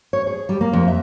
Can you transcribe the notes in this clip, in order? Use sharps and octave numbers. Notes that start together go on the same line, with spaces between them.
C#5
G#4
G3
A#3
F2
E5